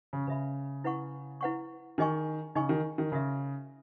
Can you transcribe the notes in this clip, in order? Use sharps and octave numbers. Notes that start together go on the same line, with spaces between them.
C#3
C#3 B4 E5 B5
E4 B4 F#5 C#6
E4 B4 F#5 C#6
D#3 D#4 G#4 D#5 G#5 C#6
C#3 D#4 G#4 D#5 G#5 C#6
D#3
D#3
C#3 F#4 A#4 E5